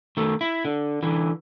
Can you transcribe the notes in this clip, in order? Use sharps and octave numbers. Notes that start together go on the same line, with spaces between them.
D#3 A3
E4
D3
D3 E3